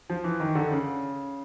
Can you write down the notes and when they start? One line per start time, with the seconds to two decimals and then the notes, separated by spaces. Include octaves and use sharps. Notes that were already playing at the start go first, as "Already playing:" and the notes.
0.10 F3
0.24 E3
0.40 D#3
0.55 D3
0.71 C#3